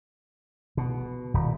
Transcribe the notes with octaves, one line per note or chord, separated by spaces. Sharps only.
B2
D#1